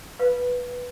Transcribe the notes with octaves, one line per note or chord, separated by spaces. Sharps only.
B4 F5 B5